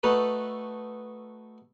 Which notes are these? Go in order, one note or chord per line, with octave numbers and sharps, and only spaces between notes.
A3 D#4 F#4 A4 B4